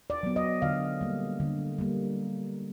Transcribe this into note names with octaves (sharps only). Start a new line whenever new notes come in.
D5
F#3 B3
D#5
D3 F5
G3 A#3
D3
G3 A#3